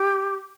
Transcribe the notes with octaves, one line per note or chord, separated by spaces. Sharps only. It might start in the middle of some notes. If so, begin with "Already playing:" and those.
Already playing: G4